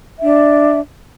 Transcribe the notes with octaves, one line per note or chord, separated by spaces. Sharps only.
D4 E5